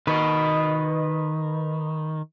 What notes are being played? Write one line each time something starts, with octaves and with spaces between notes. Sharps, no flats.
D#3 B4 D#5